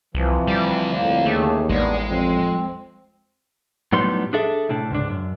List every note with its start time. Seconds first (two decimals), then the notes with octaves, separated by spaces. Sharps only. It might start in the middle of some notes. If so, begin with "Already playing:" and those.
0.15 C2 C3 E3 F3
0.47 D2 G3 D5
0.94 F2 A2 A#3
1.26 D#2 A3 C#4 G4 G#4
1.69 A1 G3 G#3 B3 D4
2.08 F2 C4
3.92 A2 F#3 G3 B3 D#4 C6
4.33 D4 G#4 A4 E5
4.69 A2 C3 D4
4.91 C#2 G#2 D4
5.10 F#2